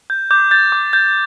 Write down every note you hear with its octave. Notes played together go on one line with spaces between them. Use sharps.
G6
D6 G6
G6 A6
D6
G6